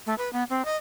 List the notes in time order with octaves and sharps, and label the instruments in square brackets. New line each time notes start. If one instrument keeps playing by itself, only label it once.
[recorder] A3
B4
B3
C4
D#5